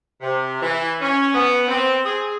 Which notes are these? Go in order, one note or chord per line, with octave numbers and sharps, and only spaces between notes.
C3
E3
C#4
B3
C4
G#4